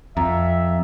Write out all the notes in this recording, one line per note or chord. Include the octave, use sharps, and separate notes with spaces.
F2 E5 A#5